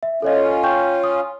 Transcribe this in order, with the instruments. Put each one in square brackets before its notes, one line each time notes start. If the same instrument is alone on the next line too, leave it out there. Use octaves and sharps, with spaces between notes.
[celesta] E5
[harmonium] C#4 F4 [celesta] A4 C#5 D#5
[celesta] G5 C#6 G6
D#6